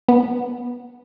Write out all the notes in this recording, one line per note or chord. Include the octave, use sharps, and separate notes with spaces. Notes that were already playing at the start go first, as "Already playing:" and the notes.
B3